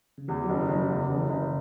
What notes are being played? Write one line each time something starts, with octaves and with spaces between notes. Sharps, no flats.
C#3
E2 E3
F#3
F#1
E3
F#1 F#3
C#3
E2 E3
F#1
E3
C#3
F#1